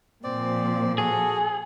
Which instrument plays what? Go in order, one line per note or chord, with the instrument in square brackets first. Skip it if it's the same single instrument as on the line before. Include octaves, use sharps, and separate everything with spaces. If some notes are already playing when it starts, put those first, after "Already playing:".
[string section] A#2 F3 [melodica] C4 D5
[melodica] F#4 A4 [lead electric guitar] G#4